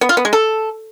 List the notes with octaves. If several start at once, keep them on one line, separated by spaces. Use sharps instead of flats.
B3
F4
B3
G#3
A4